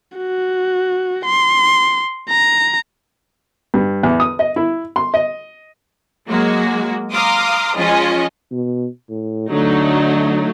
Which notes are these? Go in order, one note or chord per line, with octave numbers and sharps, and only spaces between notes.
F#4
C6
A#5
G2
E2
D#6
D#5
E4
C6
D#5
F#3 G#3 A#3 F#4
F5 A#5 C6 D6 D#6
F3 G#3 C#4 F4 G#4 D#5
B2
A2
D3 F#3 A3 D#4